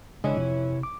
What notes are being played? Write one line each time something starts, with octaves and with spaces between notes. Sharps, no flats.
C#3 E3 G#3 C#4 D4 E4 D#5
F2 C3
D6